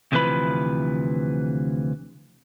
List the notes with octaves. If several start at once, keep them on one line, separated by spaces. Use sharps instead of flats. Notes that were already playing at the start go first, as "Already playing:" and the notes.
D2 C3 E3 F3 B4 B5